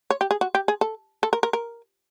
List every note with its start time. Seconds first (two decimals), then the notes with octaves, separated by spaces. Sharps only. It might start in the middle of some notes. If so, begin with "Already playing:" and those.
0.10 C#5
0.21 G4
0.31 G#4
0.41 F#4
0.55 G4
0.68 G#4
0.81 A4
1.23 A4
1.33 A#4
1.43 A#4
1.53 A#4